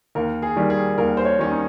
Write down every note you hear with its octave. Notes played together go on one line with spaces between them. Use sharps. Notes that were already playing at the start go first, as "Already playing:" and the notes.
D#2 A#4
G#4
D#3 G3
G#4
D#2 A#4
C5
C#5
D#3 G3 C#4
D#4